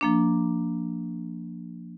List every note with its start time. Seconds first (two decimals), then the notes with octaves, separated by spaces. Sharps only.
0.01 F3 A#3 D4